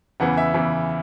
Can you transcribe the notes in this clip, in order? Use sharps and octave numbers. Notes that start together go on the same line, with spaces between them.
E2 C#3 E3 F#5
E5
E2 C#3 E3